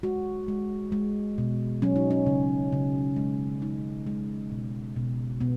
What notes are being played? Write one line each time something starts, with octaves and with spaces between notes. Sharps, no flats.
G#3 F#4
G#3
G#3
B2
F#3 C#4
D#4
C#4
C#3
C#3
G#3
G#3 D#4
G#3
B2
B2
B2 B3